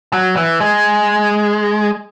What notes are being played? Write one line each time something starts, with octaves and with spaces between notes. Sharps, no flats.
F#3
E3
G#3